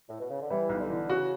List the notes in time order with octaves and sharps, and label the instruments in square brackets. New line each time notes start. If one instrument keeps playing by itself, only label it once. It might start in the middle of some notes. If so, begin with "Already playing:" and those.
[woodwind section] A2
B2
C#3
D3
[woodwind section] E3 [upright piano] G3
[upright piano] B1
[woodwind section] D3
[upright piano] E3
[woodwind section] C#3 [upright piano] F#4